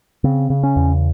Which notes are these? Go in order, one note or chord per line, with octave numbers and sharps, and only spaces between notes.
C#3 C4
C#3
C#4
E2